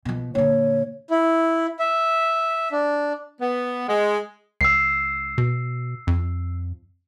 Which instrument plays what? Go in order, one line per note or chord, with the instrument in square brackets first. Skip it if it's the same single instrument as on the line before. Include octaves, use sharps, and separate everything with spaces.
[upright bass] B2 F3
[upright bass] A#2 D3 [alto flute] C#5
[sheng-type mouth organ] E4
E5
D4
[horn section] B3
G#3
[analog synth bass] C#2 [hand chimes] E6 C7
[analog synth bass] B2
F2